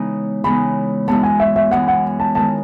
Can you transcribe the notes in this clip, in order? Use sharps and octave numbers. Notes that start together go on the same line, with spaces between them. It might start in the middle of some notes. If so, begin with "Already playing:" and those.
Already playing: C#3 E3 G#3 B3 D#4
C#3 E3 G#3 B3 D#4 B5
F#2 E3 G#3 B3 A5
G#5
E5
E5
F#2 E3 G#3 B3 F#5
F#5
A5
D#3 G#3 B3 A5